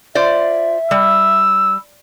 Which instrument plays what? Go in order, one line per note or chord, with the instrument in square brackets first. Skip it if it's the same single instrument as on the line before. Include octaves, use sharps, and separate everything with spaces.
[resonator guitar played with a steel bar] F4 C5 D5 [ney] E5
[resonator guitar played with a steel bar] G3 [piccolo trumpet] E6